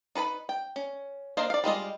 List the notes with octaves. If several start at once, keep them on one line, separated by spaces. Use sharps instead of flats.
D#4 B4 A5 B5
G5
C#4
A#3 D4 C5 D#5 F5
D5 F5
G3 G#3 F4 D#5